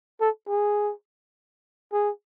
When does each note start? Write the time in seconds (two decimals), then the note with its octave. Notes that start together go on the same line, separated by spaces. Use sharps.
0.21 A4
0.49 G#4
1.92 G#4